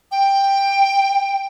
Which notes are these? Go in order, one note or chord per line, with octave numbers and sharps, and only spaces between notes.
G5